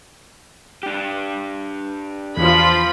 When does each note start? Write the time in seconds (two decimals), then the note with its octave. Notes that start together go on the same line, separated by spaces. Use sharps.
0.83 D4 G4
2.37 E2 F3 F4 B5